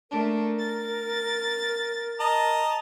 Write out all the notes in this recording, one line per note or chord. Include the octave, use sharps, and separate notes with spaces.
A3 D4 A#4
A6
D#5 A5 A#5